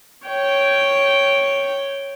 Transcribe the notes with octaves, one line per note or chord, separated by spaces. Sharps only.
C#5 G5